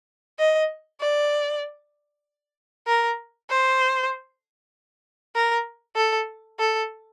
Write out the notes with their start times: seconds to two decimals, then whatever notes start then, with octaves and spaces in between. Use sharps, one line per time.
0.39 D#5
1.01 D5
2.87 A#4
3.50 C5
5.35 A#4
5.97 A4
6.59 A4